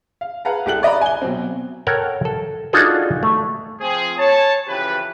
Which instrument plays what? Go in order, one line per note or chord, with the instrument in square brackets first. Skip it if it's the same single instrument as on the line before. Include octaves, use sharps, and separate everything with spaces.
[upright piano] F5
G#4 B4 F5 F#5 A5 A#5
C2 G4 A4 F#6 F#7
D5 D#5 A#5 B5
G#5 G7
B2 F#3 C4
[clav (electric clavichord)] A4 A#4 C#5 F#5 G5
A4
D4 D#4 F4 F#4 G#4 A4
A3
[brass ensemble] F3 C4 G#4
C#5 A5
F2 C#3 E3 G4 B4